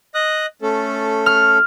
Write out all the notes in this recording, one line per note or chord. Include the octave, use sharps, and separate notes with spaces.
D#5 D#6 F#6
A3 C#4 A4
F6